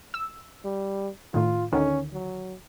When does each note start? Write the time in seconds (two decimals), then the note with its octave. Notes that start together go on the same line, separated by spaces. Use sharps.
0.14 E6
0.65 G3
1.34 A2 D#3 F4
1.73 D2 D3 D#3 C#4
2.13 F#3